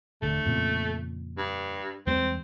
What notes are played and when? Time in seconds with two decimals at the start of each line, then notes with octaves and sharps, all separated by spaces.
0.22 D#1 D3 A3
0.45 F2 A#2 C#3
1.38 G2
2.07 E2 G3 G#3 C4